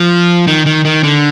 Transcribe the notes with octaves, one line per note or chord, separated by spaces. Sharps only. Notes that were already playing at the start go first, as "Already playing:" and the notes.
Already playing: F3
D#3
D#3
D#3
D3